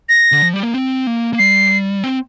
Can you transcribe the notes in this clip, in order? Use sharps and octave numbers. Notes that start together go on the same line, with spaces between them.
A#6
D3
F3
G3
A#3
C4
A#3
A#3
G3 C7
C4